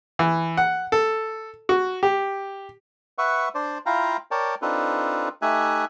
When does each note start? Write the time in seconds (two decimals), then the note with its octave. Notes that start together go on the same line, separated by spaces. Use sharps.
0.19 E3
0.57 F#5
0.92 A4
1.69 F#4
2.03 G4
3.18 B4 E5 F#5 C#6
3.55 D4 C5 D5
3.86 E4 F4 F5 G5 A#5
4.31 A#4 C#5 D5 G5 A5
4.62 C4 D4 D#4 F4 A4 B4
5.42 A3 D#4 G4 E5 G#5 F#6